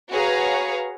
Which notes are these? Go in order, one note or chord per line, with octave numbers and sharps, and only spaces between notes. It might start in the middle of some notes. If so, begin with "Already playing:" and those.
F#4 G#4 B4 C#5 F5 A#5